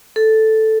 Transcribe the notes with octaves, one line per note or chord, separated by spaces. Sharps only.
A4